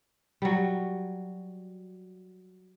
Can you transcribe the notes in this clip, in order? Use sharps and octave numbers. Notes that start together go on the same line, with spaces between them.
F#3 G3